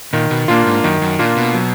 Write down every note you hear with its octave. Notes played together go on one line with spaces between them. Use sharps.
A#2 D#3
B2
A#2 A#3 D4 F4
G#2
F#2 D#3
F#2
A#2 A#3 D4 F4
B2
F#3